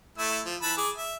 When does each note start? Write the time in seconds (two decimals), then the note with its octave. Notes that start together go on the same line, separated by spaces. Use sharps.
0.18 A3 E4 E6
0.46 F3
0.63 E3 A5 B5
0.77 G#4 D6
0.97 E5